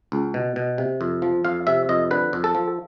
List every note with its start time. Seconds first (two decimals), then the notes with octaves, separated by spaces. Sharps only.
0.12 C#2
0.34 B2
0.56 B2
0.78 C3
1.01 F2
1.22 F3
1.45 F2 F5
1.67 C3 E5
1.89 F2 D#5
2.11 D3 B4
2.33 F2
2.44 A4
2.55 F3